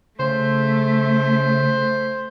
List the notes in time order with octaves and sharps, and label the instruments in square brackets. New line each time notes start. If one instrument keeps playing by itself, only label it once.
[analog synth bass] C#3 [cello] A3 [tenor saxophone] C5